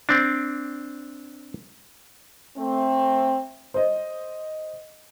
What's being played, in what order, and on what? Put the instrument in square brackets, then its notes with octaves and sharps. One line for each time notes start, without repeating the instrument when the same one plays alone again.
[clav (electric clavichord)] C4 D4
[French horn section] A3 C4
[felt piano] C5 D#5